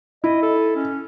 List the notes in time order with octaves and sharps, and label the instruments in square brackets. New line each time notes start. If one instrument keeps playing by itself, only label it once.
[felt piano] E4 [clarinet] D#5
[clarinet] A4
C#4